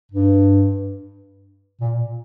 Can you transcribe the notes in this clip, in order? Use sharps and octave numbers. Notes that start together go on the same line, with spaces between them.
G2
A#2